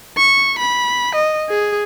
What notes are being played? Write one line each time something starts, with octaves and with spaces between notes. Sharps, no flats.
C#6
B5
D#5
G#4